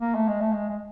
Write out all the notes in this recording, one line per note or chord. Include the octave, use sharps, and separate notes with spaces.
A#3
A3
G#3
A3
G#3
G#3